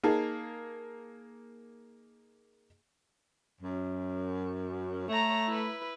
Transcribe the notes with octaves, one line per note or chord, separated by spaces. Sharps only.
A#3 D#4 G#4 A5
F#2
A3 C#5 A#5
E4 B4